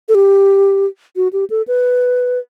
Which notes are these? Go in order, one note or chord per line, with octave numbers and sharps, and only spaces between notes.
A4
G4
F#4
G4
A4
B4